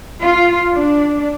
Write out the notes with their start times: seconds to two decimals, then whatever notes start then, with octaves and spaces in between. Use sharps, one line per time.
0.19 F4
0.73 D4